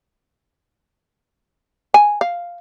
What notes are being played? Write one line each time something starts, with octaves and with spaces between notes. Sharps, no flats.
G#5
F5